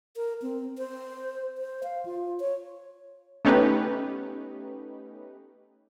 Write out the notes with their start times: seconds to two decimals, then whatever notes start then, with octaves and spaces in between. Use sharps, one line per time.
0.16 A#4
0.42 C4
0.78 C5
1.58 C5
1.83 F5
2.05 F4
2.40 C#5
3.45 A3 B3 C#4 D#4 G4 B4